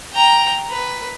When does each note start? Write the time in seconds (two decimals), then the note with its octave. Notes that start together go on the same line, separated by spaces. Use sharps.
0.14 G5 A#5
0.70 B4